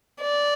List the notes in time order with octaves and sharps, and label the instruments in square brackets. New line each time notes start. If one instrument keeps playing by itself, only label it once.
[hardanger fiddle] D5